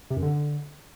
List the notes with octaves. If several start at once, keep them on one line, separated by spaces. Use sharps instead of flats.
C3
F#2
D3